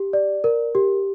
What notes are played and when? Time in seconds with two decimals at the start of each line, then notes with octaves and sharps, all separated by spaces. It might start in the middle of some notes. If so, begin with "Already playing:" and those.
Already playing: G4
0.13 D5
0.44 A#4
0.75 G4